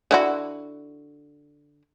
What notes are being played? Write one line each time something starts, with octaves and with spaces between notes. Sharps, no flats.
D3 E4 F#4